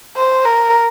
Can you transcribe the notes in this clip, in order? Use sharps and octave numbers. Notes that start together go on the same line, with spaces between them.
C5
A#4